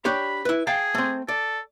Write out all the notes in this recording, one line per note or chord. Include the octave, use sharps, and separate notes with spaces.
D4 G4 C#5 B5
E4 B4
G#4 F5 G5 A5
A3 C4
A4 D5